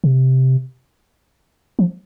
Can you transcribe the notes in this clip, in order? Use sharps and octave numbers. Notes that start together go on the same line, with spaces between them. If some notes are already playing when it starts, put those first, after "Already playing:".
C3
F3